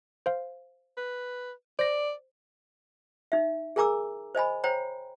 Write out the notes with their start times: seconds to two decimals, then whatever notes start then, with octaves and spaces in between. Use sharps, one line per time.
0.26 C5 F5
0.97 B4
1.79 C5 D5 A#6
3.32 D#4 E5
3.76 G#4 A#4 G#5 A#5 D6 E6
4.35 C5 D#5 G#5 B5
4.64 C5 C#5 G5 A#5